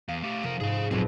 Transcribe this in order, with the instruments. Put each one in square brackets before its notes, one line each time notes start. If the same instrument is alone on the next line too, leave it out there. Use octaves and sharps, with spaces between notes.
[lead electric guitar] E2 [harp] F5
[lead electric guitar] A3 G4
[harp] F1 [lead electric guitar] F3 A#4
[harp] G#2 [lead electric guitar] G#4 F5
[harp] B1 F2 A#2 [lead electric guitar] F#3 C4